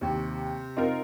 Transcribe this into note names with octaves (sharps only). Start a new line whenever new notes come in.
D#2 C3 G5
C4 D#4 F4 A#4